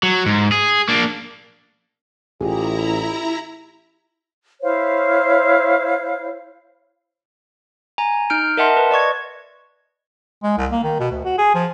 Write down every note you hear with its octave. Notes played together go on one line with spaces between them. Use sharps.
F#3
G#2
G#4
A#3 D4
A1 E4 F4 G4 G#4 A#5
E4 C5 C#5 F5
G#5 A#5
D#4 F6 G6 D7
A#4 D#5 E5 F#5 A5 C6
B4
D5 D#5 C#6 G#6
G#3
C2
A#3
D#3
B2
D2
F#4
G#4
F3